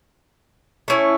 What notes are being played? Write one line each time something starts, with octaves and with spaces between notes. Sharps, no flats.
A3 C#4 E4